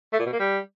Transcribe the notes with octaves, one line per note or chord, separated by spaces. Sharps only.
A3
A#2
B2
A#3
G3